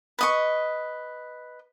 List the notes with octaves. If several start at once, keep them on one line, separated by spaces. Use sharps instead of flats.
B4 D#5 C#6